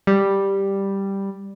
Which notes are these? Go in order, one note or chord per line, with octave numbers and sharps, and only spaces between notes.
G3